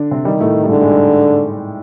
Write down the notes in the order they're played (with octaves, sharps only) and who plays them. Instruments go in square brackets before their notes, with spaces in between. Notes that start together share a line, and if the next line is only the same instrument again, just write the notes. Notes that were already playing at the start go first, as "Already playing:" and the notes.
Already playing: [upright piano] D3 D4
C3 C4
[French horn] D#3 [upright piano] G3
[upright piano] A2 A3
G3
[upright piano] G#2 G#3 [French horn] D3
[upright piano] G#3
G3